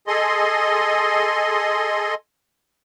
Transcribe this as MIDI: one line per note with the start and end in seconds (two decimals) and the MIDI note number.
0.07 2.14 68
0.07 2.14 69
0.07 2.14 75
0.07 2.14 84